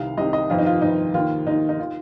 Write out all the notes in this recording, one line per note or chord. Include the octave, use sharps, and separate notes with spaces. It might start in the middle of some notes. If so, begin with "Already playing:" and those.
Already playing: C2 C3 D#3 F5
C2 C3 D#3 D#5
D#5
G1 F2 D#3 F4
D#4
F4
G1 F2 D#3 D#4
D#2 D#3 F4
D#2 D#3 D#4
D#4
D#3 F4